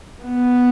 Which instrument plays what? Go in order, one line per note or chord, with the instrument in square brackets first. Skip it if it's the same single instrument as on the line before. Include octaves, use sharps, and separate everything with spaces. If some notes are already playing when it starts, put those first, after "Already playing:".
[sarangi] B3